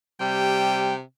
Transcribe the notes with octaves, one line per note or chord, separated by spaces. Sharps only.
C3 G3 G5